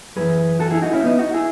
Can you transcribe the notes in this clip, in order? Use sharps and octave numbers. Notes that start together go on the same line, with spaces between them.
F#2 E3 G#4 B4
F#4 A4
E4 G#4
D#4 F#4
C#4 E4
B3 D#4
D#4 F#4
E4 G#4